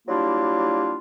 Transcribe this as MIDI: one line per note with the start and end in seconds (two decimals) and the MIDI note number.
0.07 0.98 54
0.07 0.98 55
0.07 0.98 58
0.07 0.98 62
0.07 0.98 64
0.07 0.98 65